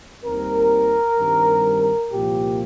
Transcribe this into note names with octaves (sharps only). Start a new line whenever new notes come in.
D#2 D#3 G3 C4 A#4
G2 D#3 G3 C4
C2 A#2 F3 A#3 G4